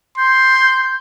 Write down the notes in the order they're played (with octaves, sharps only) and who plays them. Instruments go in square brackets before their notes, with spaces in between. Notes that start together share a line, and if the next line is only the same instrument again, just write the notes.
[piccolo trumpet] C6 [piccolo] G6